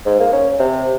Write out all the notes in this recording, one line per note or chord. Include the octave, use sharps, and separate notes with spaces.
G#2
A#3
C#4
C3